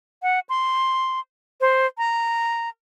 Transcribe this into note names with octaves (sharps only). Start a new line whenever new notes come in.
F#5
C6
C5
A#5